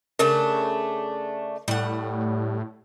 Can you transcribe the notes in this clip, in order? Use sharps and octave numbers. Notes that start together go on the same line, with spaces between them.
C#3 A3 D4 A#4
A2 G3 F#5